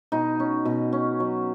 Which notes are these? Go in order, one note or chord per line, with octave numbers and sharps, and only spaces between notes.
B2 D#4
C#4
B2
C#4
F#3